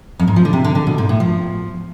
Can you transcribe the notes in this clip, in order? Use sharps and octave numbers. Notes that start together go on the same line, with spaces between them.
F2
G#2
F3
D3
C3
D3
D3
B2
G#2
A2
F3